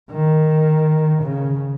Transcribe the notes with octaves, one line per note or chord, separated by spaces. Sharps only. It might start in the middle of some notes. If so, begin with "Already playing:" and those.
D#3
C#3